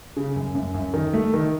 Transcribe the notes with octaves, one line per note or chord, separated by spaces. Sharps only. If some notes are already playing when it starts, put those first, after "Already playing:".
C#3
F#2
F#2
F#2
D#3
A3
D#3